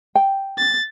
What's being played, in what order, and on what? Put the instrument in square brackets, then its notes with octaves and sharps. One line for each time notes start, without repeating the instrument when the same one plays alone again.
[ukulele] G5
[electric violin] A6